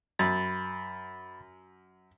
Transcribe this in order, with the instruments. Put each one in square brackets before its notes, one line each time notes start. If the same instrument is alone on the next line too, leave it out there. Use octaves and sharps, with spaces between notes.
[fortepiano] F#2 [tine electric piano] B5 A6